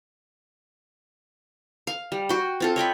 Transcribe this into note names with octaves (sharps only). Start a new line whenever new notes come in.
F5
G3
F#4 G5
C4 F4 A4
C#5 D#5 G5 B5